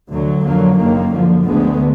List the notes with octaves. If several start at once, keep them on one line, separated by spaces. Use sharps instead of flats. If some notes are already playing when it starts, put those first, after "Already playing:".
D2 D3 F#3
F2 D3 F#3 A#3
F#1 F#2 D#3 A#3
F#2 D3 F3
D2 D3 G#3 B3